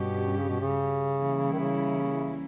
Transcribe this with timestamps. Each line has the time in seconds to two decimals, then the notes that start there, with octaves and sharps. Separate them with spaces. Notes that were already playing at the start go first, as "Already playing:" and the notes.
Already playing: G2 B2 G3 C#4 G4
0.37 C#3
0.49 B2
0.61 C#3
1.17 E3 G3 A#3 C#4 E4
1.53 D#3
1.59 C#3